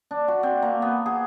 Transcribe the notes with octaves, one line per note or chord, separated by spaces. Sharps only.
D4
F#4
C4
A#3
B3
G#4